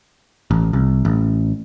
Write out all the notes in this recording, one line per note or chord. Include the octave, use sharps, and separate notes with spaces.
A1
C2
A1